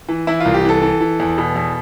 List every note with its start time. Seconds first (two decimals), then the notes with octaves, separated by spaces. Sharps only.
0.09 E3
0.27 E3 E4
0.40 C2 F4
0.54 G4
0.64 E3 A4
0.82 E3
1.00 E3
1.20 E2
1.38 B2
1.56 E2